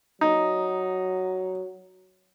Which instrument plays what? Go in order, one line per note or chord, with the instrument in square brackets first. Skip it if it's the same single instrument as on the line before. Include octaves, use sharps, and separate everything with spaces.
[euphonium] F#3 [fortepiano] D#4